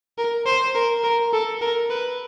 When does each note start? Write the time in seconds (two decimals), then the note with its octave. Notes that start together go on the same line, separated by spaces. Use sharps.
0.18 A#4
0.46 C5
0.75 A#4
1.04 A#4
1.33 A4
1.61 A#4
1.90 B4